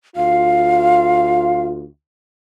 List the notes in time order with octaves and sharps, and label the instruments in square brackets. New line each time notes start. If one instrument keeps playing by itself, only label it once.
[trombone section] D2 F4 [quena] F5